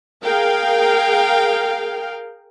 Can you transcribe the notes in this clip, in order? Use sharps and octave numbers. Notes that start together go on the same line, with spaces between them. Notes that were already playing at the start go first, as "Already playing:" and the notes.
G#4 A#4 F5 G5